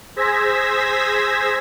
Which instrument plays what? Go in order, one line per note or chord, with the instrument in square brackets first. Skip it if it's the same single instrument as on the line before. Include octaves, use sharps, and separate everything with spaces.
[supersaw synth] G#4 C5 E6 G#6 A#6 B6